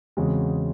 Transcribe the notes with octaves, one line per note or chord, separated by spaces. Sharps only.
E2 C#3 G#3 C4 F#4